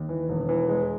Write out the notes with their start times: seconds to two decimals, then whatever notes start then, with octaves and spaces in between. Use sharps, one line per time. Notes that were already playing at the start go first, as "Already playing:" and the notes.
Already playing: D#2
0.09 E3
0.29 E1
0.49 E3
0.69 G#3